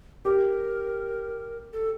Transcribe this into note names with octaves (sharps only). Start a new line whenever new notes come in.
G4 A#4
A4